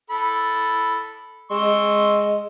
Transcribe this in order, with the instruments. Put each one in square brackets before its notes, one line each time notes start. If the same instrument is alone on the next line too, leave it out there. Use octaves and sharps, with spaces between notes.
[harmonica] A4 B5
[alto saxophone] G#3 [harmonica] C6 C#6 E6